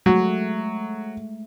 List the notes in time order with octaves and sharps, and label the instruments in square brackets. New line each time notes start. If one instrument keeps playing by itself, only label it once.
[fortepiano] F#3 [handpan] G#3 A3